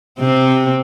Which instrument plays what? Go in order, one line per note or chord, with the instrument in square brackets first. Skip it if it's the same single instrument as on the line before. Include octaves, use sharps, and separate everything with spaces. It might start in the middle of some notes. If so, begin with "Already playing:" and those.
[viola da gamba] C3 C4